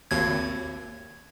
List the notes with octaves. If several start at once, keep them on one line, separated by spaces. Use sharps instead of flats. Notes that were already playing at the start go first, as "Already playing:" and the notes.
G#1 D#2 G#6